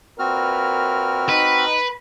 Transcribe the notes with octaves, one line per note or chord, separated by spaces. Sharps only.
A#2 C4 F#4 A#4 B4 F6
D#4 B4